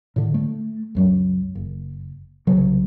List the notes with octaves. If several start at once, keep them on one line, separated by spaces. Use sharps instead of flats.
A2 D3
A3
C#2 F#2 F#3
F#1
C2 C#3 F#3